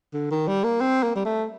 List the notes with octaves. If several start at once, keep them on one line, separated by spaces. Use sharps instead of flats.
D3
D#3
G3
A#3
C4
A#3
G3
A3